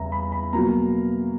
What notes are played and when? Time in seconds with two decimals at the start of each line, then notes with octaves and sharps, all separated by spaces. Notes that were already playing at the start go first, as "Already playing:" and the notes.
Already playing: E2 C#3 G3 E5 A#5
0.12 B5
0.32 B5
0.53 B2 F#3 A#3 A#5